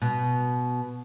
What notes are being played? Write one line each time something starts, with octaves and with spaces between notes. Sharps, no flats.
B2